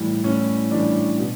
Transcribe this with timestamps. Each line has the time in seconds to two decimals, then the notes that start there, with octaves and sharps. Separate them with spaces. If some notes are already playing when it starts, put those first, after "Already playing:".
Already playing: A2 E3 G3
0.24 A2 C#4
0.71 E3 G3 D4
1.18 B2